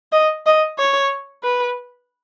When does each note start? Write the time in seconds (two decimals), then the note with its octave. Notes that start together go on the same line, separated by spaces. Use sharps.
0.12 D#5
0.46 D#5
0.79 C#5
1.43 B4